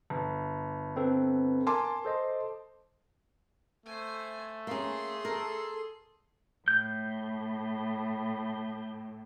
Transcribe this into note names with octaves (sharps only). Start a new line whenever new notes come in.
G1
C4 A4 B4
A#4 G#5 A5 C6 D6
A4 C5 D#5
A3 C5 G#5
A#3 C#4 G#4 C6
A4 A#4
A2 G6